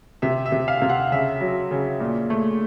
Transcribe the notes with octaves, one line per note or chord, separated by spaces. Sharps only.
C3 E5
E5
C3
F5
C3
F#5
C#3 E5
F#3
C#3
A#2
A3